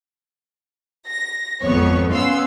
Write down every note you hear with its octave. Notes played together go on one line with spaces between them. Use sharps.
A#6
G#1 F2 B3 C#5
B3 C#4 F5 C6 E6